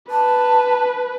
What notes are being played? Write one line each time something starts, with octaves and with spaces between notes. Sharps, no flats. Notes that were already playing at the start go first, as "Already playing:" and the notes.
B4 A5